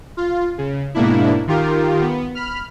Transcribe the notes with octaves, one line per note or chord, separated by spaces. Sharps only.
F4
C#3
G#2 B2 A#3 D4 E4
D#3 F4 G4 A#4
B3
B5 F6